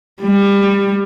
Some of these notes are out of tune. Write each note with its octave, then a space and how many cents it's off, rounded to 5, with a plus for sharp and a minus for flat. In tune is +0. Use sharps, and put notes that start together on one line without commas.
G3 +25